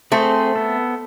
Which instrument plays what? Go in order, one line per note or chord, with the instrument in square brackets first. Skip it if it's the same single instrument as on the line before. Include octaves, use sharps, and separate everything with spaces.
[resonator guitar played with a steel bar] A3 [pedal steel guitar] C4 G#4 C5
[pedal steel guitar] B3 A4